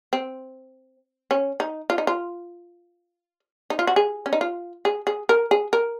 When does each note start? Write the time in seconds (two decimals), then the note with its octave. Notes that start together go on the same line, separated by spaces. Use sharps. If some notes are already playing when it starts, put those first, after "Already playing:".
0.13 C4
1.31 C#4
1.60 D#4
1.90 F4
1.98 D#4
2.07 F4
3.70 D#4
3.79 F4
3.87 F#4
3.96 G#4
4.26 C#4
4.33 D#4
4.41 F4
4.85 G#4
5.07 G#4
5.29 A#4
5.51 G#4
5.73 A#4